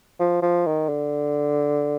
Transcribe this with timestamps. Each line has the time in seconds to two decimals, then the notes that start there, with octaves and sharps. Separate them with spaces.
0.19 F3
0.42 F3
0.66 D#3
0.89 D3